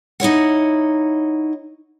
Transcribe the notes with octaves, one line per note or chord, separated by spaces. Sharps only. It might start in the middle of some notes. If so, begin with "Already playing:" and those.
D#4 E4 C#5 F#5